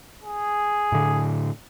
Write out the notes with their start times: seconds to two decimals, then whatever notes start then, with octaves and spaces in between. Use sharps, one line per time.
0.24 G#4
0.92 A2 D3